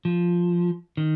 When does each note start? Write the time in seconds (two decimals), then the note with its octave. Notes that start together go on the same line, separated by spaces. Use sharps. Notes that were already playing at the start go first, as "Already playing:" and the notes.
0.05 F3
0.97 D#3